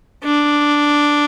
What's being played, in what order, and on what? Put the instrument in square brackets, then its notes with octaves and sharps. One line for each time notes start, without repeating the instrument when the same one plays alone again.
[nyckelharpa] D4